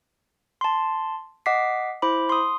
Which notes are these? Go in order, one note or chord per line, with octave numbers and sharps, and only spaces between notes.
A5 C6
D#5 F#5 D6 B6 C7
E4 C5 B5 D6
C6 D#6